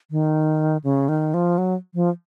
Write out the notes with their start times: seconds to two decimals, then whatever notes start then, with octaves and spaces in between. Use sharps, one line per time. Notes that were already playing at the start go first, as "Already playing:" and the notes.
0.11 D#3
0.84 C#3
1.09 D#3
1.34 F3
1.58 F#3
1.94 F3